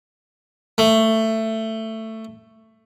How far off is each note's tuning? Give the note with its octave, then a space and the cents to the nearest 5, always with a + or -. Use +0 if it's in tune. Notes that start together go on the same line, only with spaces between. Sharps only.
A3 +15